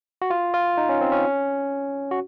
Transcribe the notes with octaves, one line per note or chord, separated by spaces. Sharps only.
F#4
F4
F4
D#4
C#4
C4
C#4
F#4